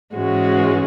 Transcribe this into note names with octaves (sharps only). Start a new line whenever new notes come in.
G#2 E3 G#3 C#4 F#4